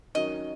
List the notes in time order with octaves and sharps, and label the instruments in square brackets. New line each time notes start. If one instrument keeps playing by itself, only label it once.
[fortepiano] D#3 F#3 C#4 [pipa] D#5